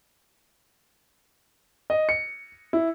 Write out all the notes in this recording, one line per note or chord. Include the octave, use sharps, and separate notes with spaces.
D#5
C#7
E4